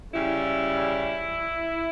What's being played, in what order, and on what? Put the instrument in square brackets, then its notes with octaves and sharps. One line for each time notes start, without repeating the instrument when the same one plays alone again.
[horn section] C#3 G3 E4